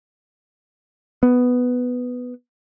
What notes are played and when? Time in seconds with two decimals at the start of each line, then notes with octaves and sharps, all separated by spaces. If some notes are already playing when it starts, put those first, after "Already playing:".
1.23 B3